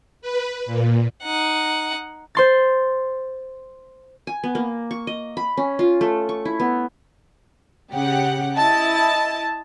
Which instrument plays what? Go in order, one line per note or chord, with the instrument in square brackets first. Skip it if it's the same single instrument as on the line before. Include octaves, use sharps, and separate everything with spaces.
[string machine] B4
A#2
[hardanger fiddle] D#4 F#5
[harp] C5 C6 A6
[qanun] G#5
B3
A#3
C#6
D#5
B5
C#4
F4
A3
C#6
E4
B3
[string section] C#3 G4 F#5
E4 D#5 A5